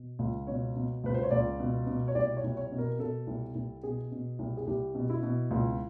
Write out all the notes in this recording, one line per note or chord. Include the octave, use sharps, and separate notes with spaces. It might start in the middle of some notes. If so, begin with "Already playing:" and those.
Already playing: B2
C#2
B2 C#5
B2
C#2 B4
C5
C#5
C#2 D5
B2
B2
C#5
C2 D5
C#5
C2
C#5
B2
A#4
B2 A4
C2
C2
B2 G#4
B2
C2
G#4
C2 G4
B2
E4
B2
C#2